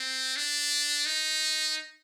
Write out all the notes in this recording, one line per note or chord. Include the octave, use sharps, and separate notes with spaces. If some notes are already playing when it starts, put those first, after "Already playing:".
Already playing: C4
D4
D#4